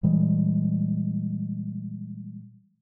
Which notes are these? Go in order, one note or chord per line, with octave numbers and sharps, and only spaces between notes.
A#2 E3 G3 G#3